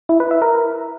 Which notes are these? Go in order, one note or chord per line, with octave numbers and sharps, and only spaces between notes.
E4
B4
E5
A#4